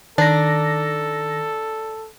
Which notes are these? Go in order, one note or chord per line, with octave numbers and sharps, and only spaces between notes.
D#3 D4 A4 A#6